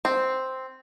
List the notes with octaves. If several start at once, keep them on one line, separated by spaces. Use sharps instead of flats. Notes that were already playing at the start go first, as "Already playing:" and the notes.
C4